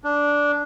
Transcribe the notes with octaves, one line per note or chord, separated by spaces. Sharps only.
D4